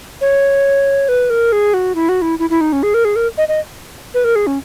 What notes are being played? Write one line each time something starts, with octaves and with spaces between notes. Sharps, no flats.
C#5
B4
A#4
G#4
F#4
E4
F#4
E4
E4
E4
D#4
C#4
G#4
A#4
G#4
A#4
D#5
D#5
B4
A#4
G#4
C#4